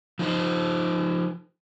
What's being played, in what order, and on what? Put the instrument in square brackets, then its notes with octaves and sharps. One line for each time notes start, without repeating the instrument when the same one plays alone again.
[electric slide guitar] F3 D#4 C5